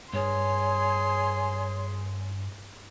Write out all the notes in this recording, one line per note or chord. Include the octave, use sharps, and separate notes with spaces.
G2 G#4 C#5 C6